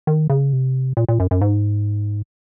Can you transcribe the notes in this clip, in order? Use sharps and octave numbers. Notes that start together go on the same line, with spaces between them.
D#3
C#3
C3
A#2
A#2
F#2
F#2
G#2